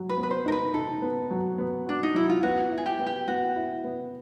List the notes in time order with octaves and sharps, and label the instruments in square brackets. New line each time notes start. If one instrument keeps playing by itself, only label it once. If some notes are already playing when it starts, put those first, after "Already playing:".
Already playing: [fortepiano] F#3
[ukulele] B4
[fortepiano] B3
[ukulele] B4
C5
[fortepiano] D#4 [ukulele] A#4
[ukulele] B4
[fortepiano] D#4 [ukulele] A4
[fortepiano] B3
F#3
B3
[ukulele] D4 [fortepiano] F#4
[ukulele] D#4
[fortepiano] F#3 [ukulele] E4
[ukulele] F4
[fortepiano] B3 [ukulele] F#4
[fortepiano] E4
[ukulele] G#4
G4
[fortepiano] B3
[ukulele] G4
[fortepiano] B3 [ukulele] F#4
[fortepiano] E4
B3